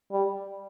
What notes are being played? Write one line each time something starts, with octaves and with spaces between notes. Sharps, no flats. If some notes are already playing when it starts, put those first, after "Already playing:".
G3